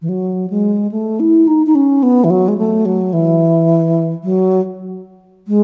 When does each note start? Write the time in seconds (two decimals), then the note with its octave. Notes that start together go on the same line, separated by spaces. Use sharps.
0.02 E3
0.09 F#3
0.50 G#3
0.92 A3
1.20 E4
1.47 D#4
1.66 D#4
1.75 C#4
2.03 B3
2.24 E3
2.30 F#3
2.48 G#3
2.58 A3
2.85 F#3
3.13 E3
4.24 F#3
5.48 G#3